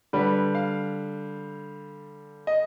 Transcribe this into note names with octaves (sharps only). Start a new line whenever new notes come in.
D3 G3 B4
F5
D#5